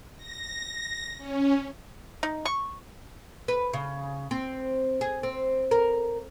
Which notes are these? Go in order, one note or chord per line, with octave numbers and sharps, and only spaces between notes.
A#6
C#4
D#4
C#6
B4
C#3
C4
G#4
C4
A#4